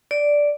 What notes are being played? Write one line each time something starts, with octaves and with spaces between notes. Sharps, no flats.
D5